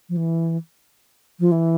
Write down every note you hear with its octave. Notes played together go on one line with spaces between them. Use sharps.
F3
E3
F3
E3